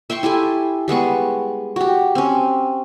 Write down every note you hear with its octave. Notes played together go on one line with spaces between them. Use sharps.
E5 G5 C6 C#6
E4 G4 A4 G#5
G3 G#3 B3 C#6
F#4 G4
C4 C#4